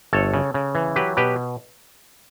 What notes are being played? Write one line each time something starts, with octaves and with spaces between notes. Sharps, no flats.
G1 A4 C#5
C#3
C#3
E3
F#3 G4 B4
B2 G4 B4